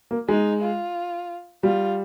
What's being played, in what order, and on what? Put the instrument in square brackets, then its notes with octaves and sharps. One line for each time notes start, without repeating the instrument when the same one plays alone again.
[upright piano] A#3
[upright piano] G#3 [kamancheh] D#4
[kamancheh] F4
[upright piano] G3 [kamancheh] F4